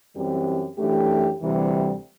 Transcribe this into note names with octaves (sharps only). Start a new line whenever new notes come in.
F#2 E3 G3 C4 G4
F#2 E3 A3 D4 G4
D2 C3 E3 G3